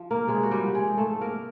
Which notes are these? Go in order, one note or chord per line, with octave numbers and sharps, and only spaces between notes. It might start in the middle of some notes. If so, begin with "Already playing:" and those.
Already playing: F3
A#3 A#4
C3 G#3 G#4
F#4
G3 G4
F3
G#3 G#4
G#2 A3 A4
A#3 A#4